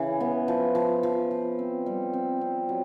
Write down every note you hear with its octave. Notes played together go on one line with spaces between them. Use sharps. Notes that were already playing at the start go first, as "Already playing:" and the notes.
Already playing: C#3 E3
B3
F3
F3
F3
F3
C4
G3
C4
C4
F#3